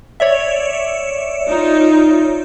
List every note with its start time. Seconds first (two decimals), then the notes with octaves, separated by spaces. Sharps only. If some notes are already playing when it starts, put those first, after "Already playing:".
0.20 C#5 D5 E5
1.48 D#4 F4